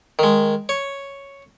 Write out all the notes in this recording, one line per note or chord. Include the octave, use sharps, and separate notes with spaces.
D#3 G#3
C#5